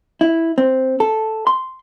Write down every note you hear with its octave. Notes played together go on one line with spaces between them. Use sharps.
E4
C4
A4
C6